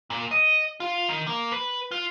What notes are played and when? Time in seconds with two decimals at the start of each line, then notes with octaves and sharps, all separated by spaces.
0.10 A#2
0.31 D#5
0.80 F4
1.09 D#3
1.27 A#3
1.52 B4
1.91 F4